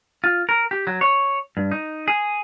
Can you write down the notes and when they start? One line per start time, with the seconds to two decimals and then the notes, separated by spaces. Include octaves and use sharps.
0.24 F4
0.49 A#4
0.71 G4
0.87 F#3
1.01 C#5
1.57 G2
1.71 D#4
2.08 G#4